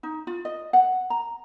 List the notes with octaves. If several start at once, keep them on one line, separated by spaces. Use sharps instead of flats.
D#4
F4
D#5
F#5
A#5